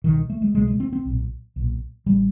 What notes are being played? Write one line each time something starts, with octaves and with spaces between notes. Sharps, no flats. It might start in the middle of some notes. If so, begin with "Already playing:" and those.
C2 B2 D#3
A3
G#3
C2 B2 G#3
G#3
C4
C4
B1 A#2
B1 A#2
A1 G3